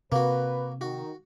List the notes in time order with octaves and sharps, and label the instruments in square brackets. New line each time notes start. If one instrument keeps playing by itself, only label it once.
[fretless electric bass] C3 [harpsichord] A#3 F#4 [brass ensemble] B4
[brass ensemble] D#3 [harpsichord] F#4